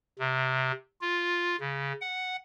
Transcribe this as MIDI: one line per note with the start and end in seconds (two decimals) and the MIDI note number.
0.19 0.72 48
1.01 1.56 65
1.60 1.93 49
2.01 2.36 78